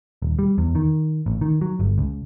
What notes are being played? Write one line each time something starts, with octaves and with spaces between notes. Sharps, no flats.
D#1
G3
E2
D#3
A1
D#3
F#3
G1
C#2